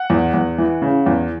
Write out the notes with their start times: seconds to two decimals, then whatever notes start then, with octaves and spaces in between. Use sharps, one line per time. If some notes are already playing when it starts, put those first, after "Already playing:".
Already playing: F#5
0.10 E2
0.34 E2
0.58 E3
0.82 C#3
1.06 E2